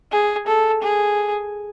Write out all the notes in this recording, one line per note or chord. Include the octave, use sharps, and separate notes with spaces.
G#4
A4
G#4